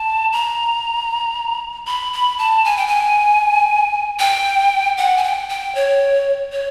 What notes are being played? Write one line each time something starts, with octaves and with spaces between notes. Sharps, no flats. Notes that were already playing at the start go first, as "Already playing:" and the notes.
Already playing: A5
A#5
B5
B5
A5
G#5
G5
G#5
G5
F#5
G#5
G5
G5
C#5
C#5